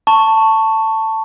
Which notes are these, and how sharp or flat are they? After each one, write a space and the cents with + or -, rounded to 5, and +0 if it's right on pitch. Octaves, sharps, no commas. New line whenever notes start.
A5 +10 C#6 +0